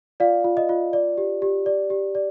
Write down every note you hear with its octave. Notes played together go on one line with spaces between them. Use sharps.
F4 D5 F5
F4
D#5
F4
D5
G4
G4
D5
G4
D5